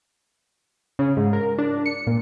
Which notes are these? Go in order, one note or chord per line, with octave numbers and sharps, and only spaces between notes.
C#3
G#2
A#4
D4
C#7
A#2